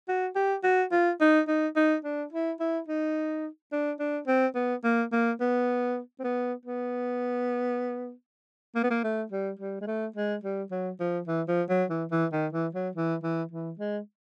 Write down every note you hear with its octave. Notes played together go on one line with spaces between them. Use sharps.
F#4
G4
F#4
F4
D#4
D#4
D#4
D4
E4
E4
D#4
D4
D4
C4
B3
A#3
A#3
B3
C4
B3
B3
A#3
B3
A#3
A3
G3
G3
G#3
A3
G#3
G3
F#3
F3
E3
F3
F#3
E3
E3
D#3
E3
F#3
E3
E3
E3
G#3